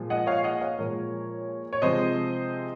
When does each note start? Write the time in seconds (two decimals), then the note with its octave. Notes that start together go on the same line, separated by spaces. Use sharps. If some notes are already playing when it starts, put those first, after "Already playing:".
Already playing: A#2 F3 G#3
0.10 D#5 F#5
0.27 C#5 F5
0.44 D#5 F#5
0.61 C#5 F5
0.78 A#2 F3 G#3 A#4 C#5
1.73 C#5
1.82 C3 F3 G#3 C5 D#5